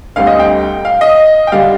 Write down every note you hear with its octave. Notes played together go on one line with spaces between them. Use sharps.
D2 D3 G3 C4 F5
D#5
G5
F5
D#5
G5
D3 G3 D4 F5